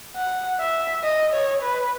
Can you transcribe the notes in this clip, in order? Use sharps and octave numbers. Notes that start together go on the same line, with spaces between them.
F#5
E5
D#5
C#5
B4